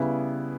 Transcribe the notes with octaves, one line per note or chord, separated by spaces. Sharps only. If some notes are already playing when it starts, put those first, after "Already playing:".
Already playing: C#3 G3 B3 E4